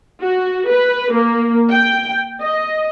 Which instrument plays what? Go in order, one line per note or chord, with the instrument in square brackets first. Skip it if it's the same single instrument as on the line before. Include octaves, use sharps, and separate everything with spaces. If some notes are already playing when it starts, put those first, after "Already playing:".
[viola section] F#4
B4
A#3
G5
D#5